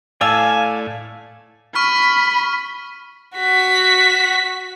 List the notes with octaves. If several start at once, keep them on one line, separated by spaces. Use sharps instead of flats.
A2 D5 F5 G#5 A5 E6
B5 C#6 F6
F#4 B6